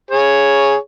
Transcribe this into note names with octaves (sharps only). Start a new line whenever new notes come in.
G#4 C#5